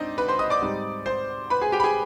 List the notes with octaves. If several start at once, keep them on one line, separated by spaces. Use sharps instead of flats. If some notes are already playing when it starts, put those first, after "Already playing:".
Already playing: G#2 C4 D4 D#4 D#5
B4 B5
C5 C6
D#5 D#6
D5 D6
G#2 G3 C4 D#4
C5 C6
B4 B5
G#4 G#5
G4 G5
B5
G#4 G#5